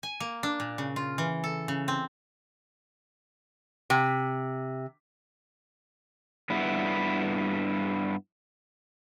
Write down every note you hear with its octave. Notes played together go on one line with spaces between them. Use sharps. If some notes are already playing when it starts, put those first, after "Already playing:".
G#5
A#3
D4
A#2
C#3
F4
E3
A4
C#3
C4
C3
G2 B3 E4